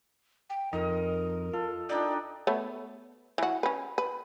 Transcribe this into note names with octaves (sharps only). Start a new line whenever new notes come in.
G5
F2 D#4 A#4 D#5
F4 A4
D4 D#4 D5 G5
A3 B3 C#5
E3 F#4
C#4 B4
B4